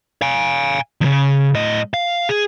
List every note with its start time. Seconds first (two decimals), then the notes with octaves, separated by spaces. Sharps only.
0.22 F5 G#5
1.01 E2 C#3
1.55 A2 D#5
1.94 F5
2.29 G#4